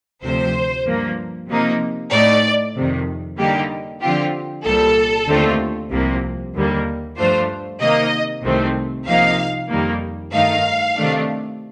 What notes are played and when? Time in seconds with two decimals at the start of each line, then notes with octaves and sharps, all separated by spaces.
0.23 D2 C3 F3 C5
0.86 G2 F3 A#3
1.49 C3 F3 A#3 D#4
2.12 A2 A3 D#4 D5
2.76 F2 C3 D#3
3.38 D3 G3 A#3 D#4 G4
4.02 D3 F3 C4 F4 G4
4.65 C2 A#2 G3 A4
5.28 D#2 D3 A3 C4 F4
5.91 C2 C3 F3 A#3
6.54 D#2 D3 G3 A#3
7.17 G2 F3 A3 D4 F4 C5
7.80 C3 D#3 A#3 D#4 D#5
8.44 C2 C3 D#3 A3 C4
9.07 C2 C3 F3 A#3 D#4 F5
9.70 F2 D#3 G3 A#3
10.33 G2 D#3 A3 D#4 F5
10.96 C3 D#3 A3 D4